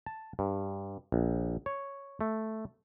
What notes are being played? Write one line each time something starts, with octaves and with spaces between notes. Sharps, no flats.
A5
G2
A#1
C#5
A3